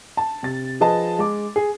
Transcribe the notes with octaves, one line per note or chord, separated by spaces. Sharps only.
A5
C3 A6
F3 G#4 B4 D#5 A5
G#3 D6
G#4